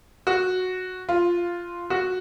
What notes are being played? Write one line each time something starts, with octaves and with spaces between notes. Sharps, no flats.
F#4
F4
F#4